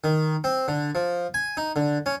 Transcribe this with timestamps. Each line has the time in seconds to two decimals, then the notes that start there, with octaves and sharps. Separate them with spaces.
0.04 D#3
0.44 C4
0.68 D3
0.95 F3
1.34 G#5
1.57 D#4
1.76 D3
2.06 C#4